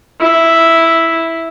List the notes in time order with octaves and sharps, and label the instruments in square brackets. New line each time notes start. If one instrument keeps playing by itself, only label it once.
[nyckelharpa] E4